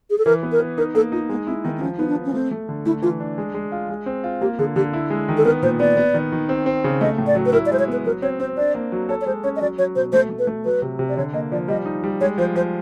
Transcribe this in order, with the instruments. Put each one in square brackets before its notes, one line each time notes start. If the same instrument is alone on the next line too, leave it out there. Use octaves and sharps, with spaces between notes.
[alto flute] G#4
A4
[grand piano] E3 [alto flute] A#4
[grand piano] B3
[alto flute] A#4
[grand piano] B3
[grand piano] D#4 [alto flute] A#4
[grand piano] A#3 [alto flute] A4
[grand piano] D#4 [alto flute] F4
[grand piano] G#3 [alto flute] B3
[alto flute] C4 [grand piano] E4
[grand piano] D#3 [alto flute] B3
[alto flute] C4
[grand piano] F3 [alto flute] C#4
[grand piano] B3 [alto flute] D#4
[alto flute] D4
[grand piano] B3
[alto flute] C#4
[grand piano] A3 [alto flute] C4
[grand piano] A3
D3
[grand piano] A3 [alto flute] E4
[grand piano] E3 [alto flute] F4
[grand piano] D4
G#3
G#3
F4
G#3
C4
F4
[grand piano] A#3 [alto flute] G4
[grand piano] D3 [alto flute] G#4
[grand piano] D3 [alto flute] G4
[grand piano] E4
G#3
D#3
[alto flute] A4
[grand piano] B3 [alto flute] A#4
[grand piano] A#2 [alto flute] C5
[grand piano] B3 [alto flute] D5
[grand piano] B3
D#3
D#3
C4
C4
C#3
[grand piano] A3 [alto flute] D#5
[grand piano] A2
[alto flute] D5
[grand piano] F#3
[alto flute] B4
[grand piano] E4 [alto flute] A#4
[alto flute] D5
[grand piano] G#3 [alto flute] C5
[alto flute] C#5
[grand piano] B3 [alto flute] B4
[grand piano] F#3 [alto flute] A#4
[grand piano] C4 [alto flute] C#5
[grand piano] C4 [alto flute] C5
[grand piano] D4 [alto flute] D5
[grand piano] A#3
F#3
[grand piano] A4 [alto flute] C#5
[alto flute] C#5
[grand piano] G#3 [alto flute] C5
[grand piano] C#4 [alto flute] C#5
[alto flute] D#5
[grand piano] F#3 [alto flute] D5
[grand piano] F#3 [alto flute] C#5
[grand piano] B2 [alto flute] C5
[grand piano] A3 [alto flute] C5
[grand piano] A3
[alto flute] B4
[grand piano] A3
[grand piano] F#3 [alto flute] B4
[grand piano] C3
C3
[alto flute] D5
[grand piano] D3 [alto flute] C#5
[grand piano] A#3 [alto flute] D#5
[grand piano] F3 [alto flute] D5
[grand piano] G3 [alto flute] D#5
[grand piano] D#4
G3
[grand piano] G#3 [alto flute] C#5
[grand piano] F3 [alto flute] C5
[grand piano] F3 [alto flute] C5